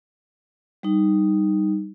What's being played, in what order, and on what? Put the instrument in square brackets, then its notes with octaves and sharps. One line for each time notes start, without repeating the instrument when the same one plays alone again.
[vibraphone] G3 D#4